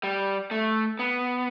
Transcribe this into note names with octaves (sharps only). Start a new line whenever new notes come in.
G3
A3
B3